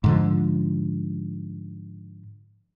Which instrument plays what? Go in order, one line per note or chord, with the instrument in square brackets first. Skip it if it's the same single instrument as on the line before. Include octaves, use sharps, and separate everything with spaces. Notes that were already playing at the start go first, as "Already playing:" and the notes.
[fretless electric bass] G#2 D3 F3